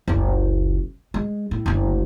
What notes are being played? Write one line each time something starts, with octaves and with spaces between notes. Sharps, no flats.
F#1 C#2
G#3
A2
F#1 D2